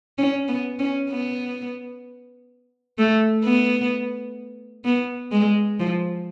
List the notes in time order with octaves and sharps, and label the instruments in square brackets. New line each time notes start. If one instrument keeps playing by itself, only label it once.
[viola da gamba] C#4
B3
C#4
B3
A3
B3
B3
G#3
F3